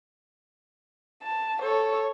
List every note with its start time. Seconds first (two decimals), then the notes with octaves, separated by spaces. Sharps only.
1.22 A5
1.62 A4 C#5